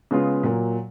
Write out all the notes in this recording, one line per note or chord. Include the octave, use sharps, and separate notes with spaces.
C#3 G#3 B3 F4
A#2 F#3 A#3